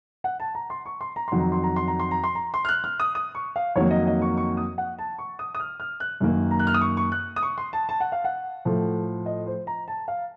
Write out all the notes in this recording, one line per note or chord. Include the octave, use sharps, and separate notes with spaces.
F#5
A5
A#5
C6
C#6
C6
A#5
F2 D#3 F#3 C6
A#5
C6
A#5
C6
A#5
C6
A#5
C6
A#5
C6
F6
F#6
F6
D#6
D#6
C#6
F5
F2 D#3 F#3 A#3 C#5
D#5
D#5
C#6
C#6
D#6
F#5
A5
C#6
D#6
D#6
F6
F6
F#6
F#2 D#3 A#3
A#5
F#6
F6
D#6
C#6
C#6
F#6
D#6
C#6
C6
A5
A5
F#5
F5
F#5
A2 F3 A3
D#5
C5
A#5
A5
F5